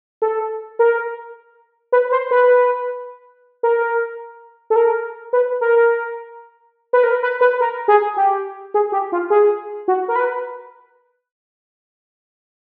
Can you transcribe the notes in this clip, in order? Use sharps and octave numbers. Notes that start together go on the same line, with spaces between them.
A4
A#4
B4
C5
B4
A#4
A4
A#4
B4
A#4
B4
A#4
B4
B4
A#4
G#4
G4
G#4
G4
F4
G#4
F#4
A#4
B4